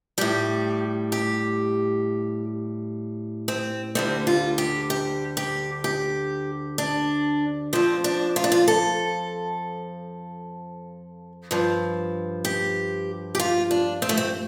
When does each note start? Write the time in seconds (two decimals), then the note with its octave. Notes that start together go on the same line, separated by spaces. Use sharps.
0.18 A2 G3 G4
1.12 G4
3.48 C4
3.95 D2 D3 G3 C4
4.27 F4
4.58 G4
4.90 G4
5.37 G4
5.84 G4
6.78 D4
7.73 F2 F3 C4
8.04 D4
8.36 F4
8.44 D4
8.52 F4
8.68 A4
11.51 G2 F3
12.45 G4
13.35 G4
13.39 F4
13.71 D4
14.02 C4
14.09 A3
14.17 C4